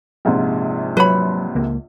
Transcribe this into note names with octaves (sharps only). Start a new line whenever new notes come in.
A#1 G#2 C3
F#3 B4 C#5 B5
C#2 A#3